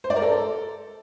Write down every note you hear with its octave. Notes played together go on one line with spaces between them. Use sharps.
C5
D5
A#4
A4